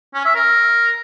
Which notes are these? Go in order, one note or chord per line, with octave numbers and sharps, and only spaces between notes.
C#4
E5
A#4